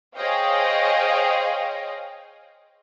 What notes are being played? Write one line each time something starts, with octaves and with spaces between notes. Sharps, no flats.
G#4 C5 C#5 D#5 F5 G5